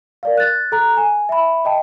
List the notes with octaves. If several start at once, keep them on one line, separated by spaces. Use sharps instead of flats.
A#4 D5 F5
F#6 A6
A4 A#5 F#6
G#5
E5 B5
D#5 G5 A5